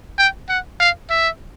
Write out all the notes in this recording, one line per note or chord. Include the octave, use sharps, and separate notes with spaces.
G5
F#5
F5
E5